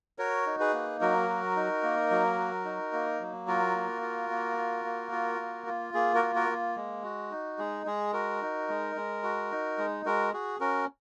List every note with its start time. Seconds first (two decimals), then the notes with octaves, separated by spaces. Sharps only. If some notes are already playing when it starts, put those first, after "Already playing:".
0.19 F#4 A#4 C#5
0.46 D#4
0.60 G#4 B4
0.74 A#3
1.01 F#3 F#4 A#4
1.28 F#4
1.56 D#4
1.83 A#3
2.11 F#3
2.38 F#4
2.65 D#4
2.93 A#3
3.20 F#3
3.47 F4 F#4 A#4
3.75 A#3
4.02 F4
4.30 A#3
4.57 F4
4.85 A#3
5.12 F4
5.39 A#3
5.67 F4
5.94 A#3 G#4
6.15 F#4 A#4
6.22 F4
6.35 F#4 A#4
6.49 A#3
6.76 G#3
7.04 F#4
7.31 D#4
7.58 G#3 G#4
7.86 G#3 G#4
8.13 F#4 A#4
8.41 D#4
8.69 G#3
8.96 G#3
9.23 F#4
9.51 D#4
9.78 G#3
10.06 G#3 F#4 A#4
10.33 F#4 G#4
10.60 C#4 F#4 A#4